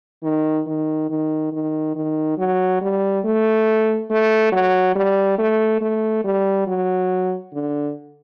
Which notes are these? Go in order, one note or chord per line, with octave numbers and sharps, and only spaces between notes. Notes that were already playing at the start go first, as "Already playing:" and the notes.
D#3
D#3
D#3
D#3
D#3
F#3
G3
A3
A3
F#3
G3
A3
A3
G3
F#3
D3